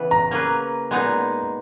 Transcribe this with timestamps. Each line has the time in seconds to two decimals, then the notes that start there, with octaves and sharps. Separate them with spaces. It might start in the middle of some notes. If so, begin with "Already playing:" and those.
Already playing: C#3 E3 B3 B4
0.11 A#5
0.31 A#3 C#4 G#4 B4
0.91 A#2 G#3 B3 D#4